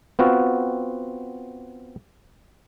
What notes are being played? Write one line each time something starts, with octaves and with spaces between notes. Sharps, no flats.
B3 C4 F4 F#4